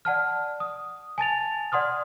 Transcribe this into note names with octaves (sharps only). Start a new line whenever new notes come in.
D5 F#5 A5 F6
D#6
G#5 A5 A6 F7
D5 F#5 C6 D#6 F6